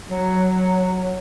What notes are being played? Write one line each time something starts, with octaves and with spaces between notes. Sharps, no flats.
F#3